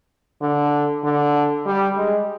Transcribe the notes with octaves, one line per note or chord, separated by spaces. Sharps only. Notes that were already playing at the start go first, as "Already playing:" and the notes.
D3
D3
G3
G#3